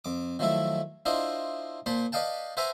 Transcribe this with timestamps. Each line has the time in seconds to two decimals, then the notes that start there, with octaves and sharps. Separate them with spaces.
0.05 F2 D6
0.39 D#3 F3 F#3 A3 E4
1.06 D4 E4 F4 C5 D#5
1.86 A#2 C5 A5 B5
2.12 B4 D5 D#5 F5 G5 A5
2.57 B4 C5 E5 F#5 G#5 A#5